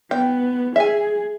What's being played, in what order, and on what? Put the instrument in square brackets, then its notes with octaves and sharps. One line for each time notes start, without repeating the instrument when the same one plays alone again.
[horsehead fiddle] B3 [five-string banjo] G5
[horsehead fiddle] G#4 [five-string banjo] E5 G#5